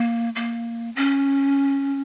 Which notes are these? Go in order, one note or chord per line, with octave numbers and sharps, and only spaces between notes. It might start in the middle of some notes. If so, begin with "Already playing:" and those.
Already playing: A#3
A#3
C#4